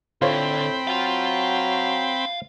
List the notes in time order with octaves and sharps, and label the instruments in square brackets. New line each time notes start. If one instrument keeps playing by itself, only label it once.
[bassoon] A2 [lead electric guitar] D3 [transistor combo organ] C4 G5 B5 [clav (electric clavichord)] F4 C5 C#5
[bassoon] F#3 [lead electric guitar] F5 C6